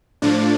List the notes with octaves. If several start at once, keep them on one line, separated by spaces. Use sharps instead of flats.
A2 F3 D4